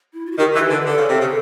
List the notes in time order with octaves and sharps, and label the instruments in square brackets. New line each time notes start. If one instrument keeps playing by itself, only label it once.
[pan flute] E4
F4
F#4
[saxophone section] D#3 [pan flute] G4
[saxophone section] E3 [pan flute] G4
[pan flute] B4
[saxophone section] D3
[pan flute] G#4
[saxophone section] D3 [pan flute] A4
[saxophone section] C#3
C3
C#3